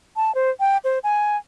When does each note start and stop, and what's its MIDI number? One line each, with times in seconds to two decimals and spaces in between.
0.16 0.34 81
0.35 0.50 72
0.60 0.77 79
0.84 0.99 72
1.03 1.37 80